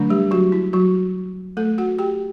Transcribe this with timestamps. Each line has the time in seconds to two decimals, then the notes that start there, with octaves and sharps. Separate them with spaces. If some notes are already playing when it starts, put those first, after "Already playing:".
Already playing: D3 F#3 A3 D4
0.10 G3 G4
0.31 F#3 F#4
0.52 E4
0.73 F#3 F#4
1.57 A3 A4
1.78 F#4 F#5
1.99 G4 G5